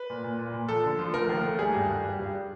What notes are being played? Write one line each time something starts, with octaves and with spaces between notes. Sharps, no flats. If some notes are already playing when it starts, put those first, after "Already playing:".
Already playing: B4
A#2
A#2
A#2
A#2
F3 A4
D3
F3
A3 A#4
D#2
A3
G3 G#4
G2
G2
G3
G2